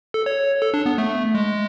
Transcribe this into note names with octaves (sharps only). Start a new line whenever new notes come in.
A4
C#5
A4
D4
B3
A3
G#3